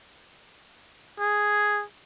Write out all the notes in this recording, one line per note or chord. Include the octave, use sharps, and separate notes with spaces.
G#4